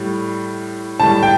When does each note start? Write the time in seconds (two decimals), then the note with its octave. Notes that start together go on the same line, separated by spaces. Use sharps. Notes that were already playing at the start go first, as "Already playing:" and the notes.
Already playing: A2 G3
1.00 A2 G3 A5
1.23 G5